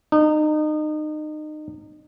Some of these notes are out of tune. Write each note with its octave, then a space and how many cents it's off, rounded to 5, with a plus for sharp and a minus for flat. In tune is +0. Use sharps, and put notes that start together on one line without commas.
D#4 -30